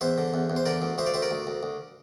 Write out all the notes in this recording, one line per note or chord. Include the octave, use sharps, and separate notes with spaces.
E2 C5 E5
D3
E2
E2
C5
D3 A#4 D5
D2
D2 C5 E5
D5 F5
D2 C5 E5
A#4 D5
D2
D2
D2